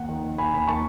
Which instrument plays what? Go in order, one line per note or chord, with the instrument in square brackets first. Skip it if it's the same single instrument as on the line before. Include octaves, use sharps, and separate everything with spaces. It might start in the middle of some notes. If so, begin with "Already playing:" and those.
Already playing: [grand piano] D#2 F#5
D#3
D#3
D#2 G#5 B5
D#2
D#3 A5 C#6